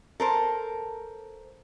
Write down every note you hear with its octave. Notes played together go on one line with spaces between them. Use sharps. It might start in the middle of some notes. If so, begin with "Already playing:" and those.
A4 A#4 C5